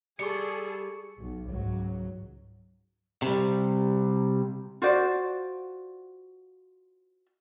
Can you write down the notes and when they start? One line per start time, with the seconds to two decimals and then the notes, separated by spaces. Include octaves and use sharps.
0.19 G3 G#4 A4 C#6 C#7
1.19 B1
1.51 C#2 G#2 F#3
3.22 C3 G3
4.82 F4 F#4 C5 D5